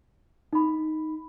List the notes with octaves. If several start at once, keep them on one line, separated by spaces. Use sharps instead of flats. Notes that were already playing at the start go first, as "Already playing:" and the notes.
D#4 B5